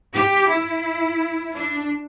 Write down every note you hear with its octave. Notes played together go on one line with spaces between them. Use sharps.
G4
E4
D4